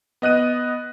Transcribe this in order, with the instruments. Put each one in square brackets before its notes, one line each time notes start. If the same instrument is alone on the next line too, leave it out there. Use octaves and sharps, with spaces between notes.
[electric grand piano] B3 D#5 F#6 D#7